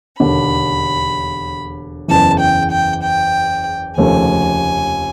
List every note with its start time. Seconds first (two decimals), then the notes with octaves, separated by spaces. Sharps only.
0.20 E1 D#2 D3 B5
2.08 F#1 E2 C#3 E3 A5
2.39 G5
2.71 G5
3.02 G5
3.97 F1 D#2 C#3 F3 A3 G#5